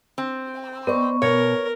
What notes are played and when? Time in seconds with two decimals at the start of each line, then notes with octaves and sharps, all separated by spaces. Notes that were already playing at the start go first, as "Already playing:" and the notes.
0.18 C4
0.87 B3 C5 D5 D#5 C#6
1.22 B2 A#4 C#5